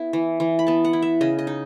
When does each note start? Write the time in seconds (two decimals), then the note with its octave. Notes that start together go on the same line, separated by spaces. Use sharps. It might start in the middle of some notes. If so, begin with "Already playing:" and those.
Already playing: B3 E4
0.13 E3
0.40 E3
0.59 B5
0.67 B3 A5
0.85 F#5
0.93 E4
1.02 E5
1.21 C#3 D#5
1.38 D#5
1.47 D#4